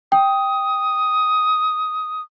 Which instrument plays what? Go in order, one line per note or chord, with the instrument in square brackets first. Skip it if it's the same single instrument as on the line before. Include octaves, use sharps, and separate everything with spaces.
[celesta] G5 [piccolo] D#6